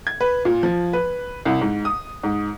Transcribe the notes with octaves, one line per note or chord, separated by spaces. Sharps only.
G#6
B4
A#2
F3
B4
C2
G#2
D#6
G#2